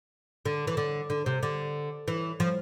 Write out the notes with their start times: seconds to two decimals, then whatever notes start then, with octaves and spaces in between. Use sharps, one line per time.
0.45 D3
0.67 E3
0.77 D3
1.10 D3
1.26 C3
1.43 D3
2.08 E3
2.40 F3